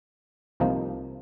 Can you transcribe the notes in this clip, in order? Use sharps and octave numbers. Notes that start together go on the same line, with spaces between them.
C2 C3 F3 A#3 D#4